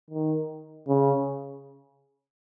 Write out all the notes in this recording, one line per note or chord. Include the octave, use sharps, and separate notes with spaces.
D#3
C#3